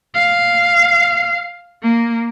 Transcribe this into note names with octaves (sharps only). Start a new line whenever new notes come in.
F5
A#3